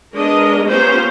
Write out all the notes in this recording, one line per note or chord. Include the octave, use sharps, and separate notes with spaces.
G#3 B3 D4 G#4 A#4 D#5
A#3 B3 C#4 F4 G4 C5